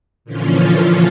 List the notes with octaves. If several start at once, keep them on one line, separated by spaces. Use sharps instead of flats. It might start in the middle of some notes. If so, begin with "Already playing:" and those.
A#2 D3 E3 F3 C#4 F4